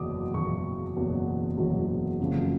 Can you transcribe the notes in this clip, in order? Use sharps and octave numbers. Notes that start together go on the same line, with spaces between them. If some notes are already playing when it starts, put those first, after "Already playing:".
Already playing: F#1 E2 B2 F#3 D6 D#6
F#1 E2 B2 F#3 C#6
F#1 E2 B2 F#3
F#1 E2 B2 F#3
F#1 F2 C#3 F#3